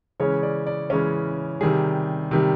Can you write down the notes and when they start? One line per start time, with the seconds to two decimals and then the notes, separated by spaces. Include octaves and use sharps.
0.20 C#3 E3 G#3 C#4 C#5
0.43 D5
0.67 D5
0.90 C#3 E3 G#3 C#4 C#5
1.61 C3 D#3 G3 G#4
2.31 C3 D#3 G3